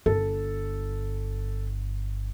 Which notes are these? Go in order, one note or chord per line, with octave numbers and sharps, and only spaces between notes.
G1 A4